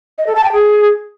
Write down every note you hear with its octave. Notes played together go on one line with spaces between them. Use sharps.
D#5
A4
A5
G5
G#4